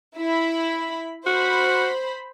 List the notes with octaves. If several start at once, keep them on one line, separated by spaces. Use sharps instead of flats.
E4 B5
F#4 C5 B5